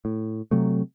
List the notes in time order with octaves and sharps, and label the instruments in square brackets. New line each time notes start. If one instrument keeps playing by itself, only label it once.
[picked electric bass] A2
C3 F#3 A3